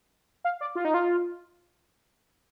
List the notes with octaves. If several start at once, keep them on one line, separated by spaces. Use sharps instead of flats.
F5
D5
F4
D#4
F4